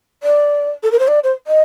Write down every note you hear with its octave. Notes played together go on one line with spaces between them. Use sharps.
D5
A4
A#4
C5
D5
C5
D#5